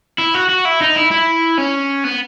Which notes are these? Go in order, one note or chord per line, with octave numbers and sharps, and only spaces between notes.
E4
F#4
F#4
E4
D#4
E4
E4
C#4
B3